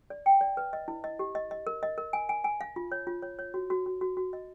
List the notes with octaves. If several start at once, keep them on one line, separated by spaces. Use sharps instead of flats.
D5
G5
D5
B4
D#5
E4
D#5
G4
D#5
D#5
A#4
D#5
A#4
G#5
G#5
G#5
F5
F4
C#5
F4
C#5
C#5
F#4
F#4
F#4
F#4
F#4
D#5